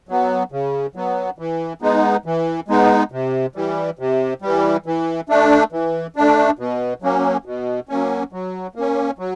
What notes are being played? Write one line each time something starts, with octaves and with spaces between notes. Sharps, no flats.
F#3 B3
C#3
F#3 B3
E3
G#3 B3 D#4
E3
G#3 B3 D#4
C3
E3 G3
C3
E3 G3
E3
A3 D4
E3
A3 D4
B2
F#3 A#3 C#4
B2
F#3 A#3 C#4
F#3
A#3 C#4
F#3